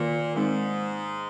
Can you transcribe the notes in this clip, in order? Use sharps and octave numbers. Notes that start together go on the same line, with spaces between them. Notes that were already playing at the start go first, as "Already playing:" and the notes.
Already playing: A#2 D#3 A#3 F4
G#2 G#3 C4 D#4